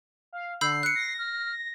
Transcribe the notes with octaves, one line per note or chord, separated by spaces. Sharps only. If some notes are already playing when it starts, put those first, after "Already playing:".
F5
D3 B5 E6 G6 C7
F#6 C#7
A#6
F6